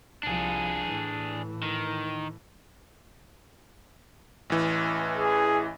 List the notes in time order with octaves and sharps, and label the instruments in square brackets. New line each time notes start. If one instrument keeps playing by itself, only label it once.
[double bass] C2 F3 [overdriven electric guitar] D4 G#4
[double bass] A2 E3
[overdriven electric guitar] D#3
[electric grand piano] A1 E3
[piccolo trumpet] G#4